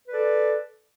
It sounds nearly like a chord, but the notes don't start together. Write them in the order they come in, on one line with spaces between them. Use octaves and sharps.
B4 D5 A4